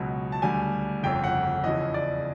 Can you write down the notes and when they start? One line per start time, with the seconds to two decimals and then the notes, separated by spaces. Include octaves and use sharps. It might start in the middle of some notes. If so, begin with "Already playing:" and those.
Already playing: C#2 B2 F#3
0.32 A5
0.42 D2 D3 G3 G#5
1.03 G1 F2 C#3 G5
1.24 F#5
1.64 E2 C#3 F3 D#5
1.94 D5